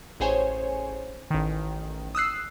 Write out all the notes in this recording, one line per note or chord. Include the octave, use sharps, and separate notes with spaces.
A1 G#4 C5 C#5 G#5
A1 D#3
D#6 E6 F#6 C7